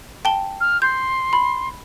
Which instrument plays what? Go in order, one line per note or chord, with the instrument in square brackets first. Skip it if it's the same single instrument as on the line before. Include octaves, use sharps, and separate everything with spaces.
[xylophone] G5 A5 G7
[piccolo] F6
[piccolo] C6 [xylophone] G6
[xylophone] B5